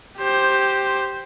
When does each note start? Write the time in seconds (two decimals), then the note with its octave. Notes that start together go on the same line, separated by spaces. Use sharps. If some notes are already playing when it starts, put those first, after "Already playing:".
0.18 G4 C5